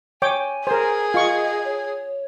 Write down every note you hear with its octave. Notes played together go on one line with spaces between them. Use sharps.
C#5 G5 G#5 D6
G#4 A#4 C5
F4 D#5 C#6
C#5